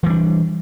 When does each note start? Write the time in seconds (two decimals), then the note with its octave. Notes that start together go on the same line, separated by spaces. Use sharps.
0.03 E3
0.06 G3
0.10 D4